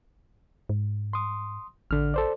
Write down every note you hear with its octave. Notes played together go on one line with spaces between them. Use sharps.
G#2
C6 D#6
A1 D3 F6
A4 C5 D5